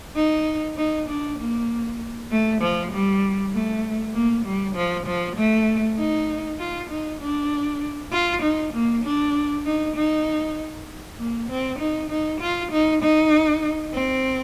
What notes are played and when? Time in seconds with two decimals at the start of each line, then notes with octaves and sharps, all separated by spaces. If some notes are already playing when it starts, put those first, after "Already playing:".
0.16 D#4
0.77 D#4
1.09 D4
1.39 A#3
2.31 A3
2.62 F3
2.92 G3
3.53 A3
4.14 A#3
4.45 G3
4.75 F3
5.07 F3
5.36 A3
5.98 D#4
6.59 F4
6.90 D#4
7.21 D4
8.12 F4
8.42 D#4
8.73 A#3
9.04 D4
9.66 D#4
9.96 D#4
11.18 A#3
11.50 C4
11.79 D#4
12.10 D#4
12.41 F4
12.72 D#4
13.02 D#4
13.93 C4